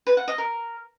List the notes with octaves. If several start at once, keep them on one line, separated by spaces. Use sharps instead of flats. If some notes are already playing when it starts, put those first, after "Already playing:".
B4
F#5
D#5
A#4